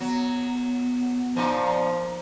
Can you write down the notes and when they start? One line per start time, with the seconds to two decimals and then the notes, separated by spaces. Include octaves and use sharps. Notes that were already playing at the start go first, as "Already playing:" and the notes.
0.01 F#3 B3
1.36 A#2 F3 D#4